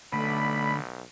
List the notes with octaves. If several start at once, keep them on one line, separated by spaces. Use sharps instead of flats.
B1 D3 A3 D5 B5